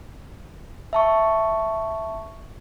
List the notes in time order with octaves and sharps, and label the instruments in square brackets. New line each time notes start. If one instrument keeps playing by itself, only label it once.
[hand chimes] E5 A5 C#6